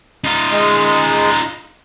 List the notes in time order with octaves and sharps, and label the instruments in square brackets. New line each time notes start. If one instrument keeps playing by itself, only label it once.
[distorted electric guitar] D#4 F4
[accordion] G#3